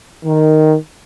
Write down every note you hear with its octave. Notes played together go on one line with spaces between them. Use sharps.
D#3